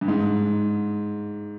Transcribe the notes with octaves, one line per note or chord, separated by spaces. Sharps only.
G2
G#2